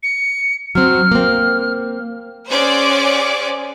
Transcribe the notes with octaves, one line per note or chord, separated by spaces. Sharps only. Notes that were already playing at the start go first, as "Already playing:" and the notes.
C#7
F#3 C4 F6
A#3 C4
C#4 G#4 C5 D5 F#5 D6